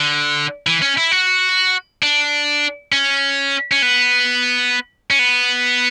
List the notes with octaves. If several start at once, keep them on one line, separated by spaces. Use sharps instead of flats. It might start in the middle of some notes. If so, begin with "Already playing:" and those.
Already playing: D3
E3
C#4
E4
F#4
D4
C#4
C#4
B3
C#4
B3